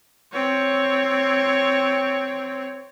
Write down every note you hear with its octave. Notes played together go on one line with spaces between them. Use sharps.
C4 C#5